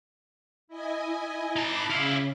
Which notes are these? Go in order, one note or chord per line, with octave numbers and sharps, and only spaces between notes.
E4 D#5 G#5
D#4 A5 B5 D6
C#3 E4 F4